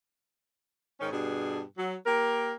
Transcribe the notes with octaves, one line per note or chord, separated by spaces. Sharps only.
G#2 D#3 C#4
G2 B2 D4 G#4
F#3
A#3 G4 A#4